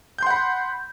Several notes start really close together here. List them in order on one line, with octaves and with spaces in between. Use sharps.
G6 C6 F#5 B5